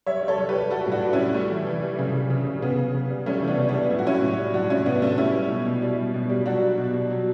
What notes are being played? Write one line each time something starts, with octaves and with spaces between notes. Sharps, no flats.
G3 C#5 E5
G3
A4 C#5
G3
G4 B4
G3
G3 F#4 A4
A2
D4 F#4
A2
C#4 E4
G3
G3 A3
E3
E3
G3
C#3
C#3
C#3
C#3
C#3 B3
C#3
C#3
G3
G3 A3 C#4
E3
B3 D4
C#3
B3 D4
G3
A2 E4
F#4
A2 C#4 E4
A2
G3
A2 D4 F#4
A2 C#4 E4
A2 B3 D4
A2 A3 C#4
G3 C#4 E4
G3
B2
B2
G3
G3
B2
G3
F#3 D4 F#4
F#3
B2
B2
F#3